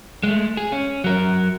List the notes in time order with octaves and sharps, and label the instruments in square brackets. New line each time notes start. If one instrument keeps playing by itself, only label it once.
[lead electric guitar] G#3 A3
G#4
C#4
F#3 A#4